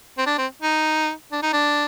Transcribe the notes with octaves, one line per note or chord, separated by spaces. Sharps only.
C4
D4
C4
D#4
D4
D#4
D4